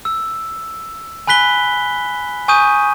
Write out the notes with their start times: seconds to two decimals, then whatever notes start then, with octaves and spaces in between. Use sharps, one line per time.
0.05 E6
1.27 G#5 B5 F#6 B6 G7
2.48 G#5 C#6 D#6 G6 D#7